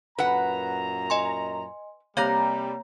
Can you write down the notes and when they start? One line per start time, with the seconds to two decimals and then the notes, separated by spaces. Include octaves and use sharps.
0.18 F#2 A#2 B4 F#5 A#5
1.10 D#5 G#5 C6
2.17 C3 G3 A#3 C#5 A#5 G6 A#6